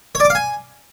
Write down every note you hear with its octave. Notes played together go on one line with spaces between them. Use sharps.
C#5
D5
D6
F5
G#5